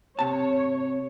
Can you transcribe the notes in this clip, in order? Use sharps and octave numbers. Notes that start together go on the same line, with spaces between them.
C3 C#5 A5